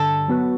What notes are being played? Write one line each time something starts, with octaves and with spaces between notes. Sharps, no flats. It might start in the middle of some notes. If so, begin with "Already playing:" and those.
Already playing: G2 D3 G3 A4
F#3 B3 F#4 B4